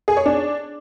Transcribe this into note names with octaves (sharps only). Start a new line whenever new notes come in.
G#4
C#5
D4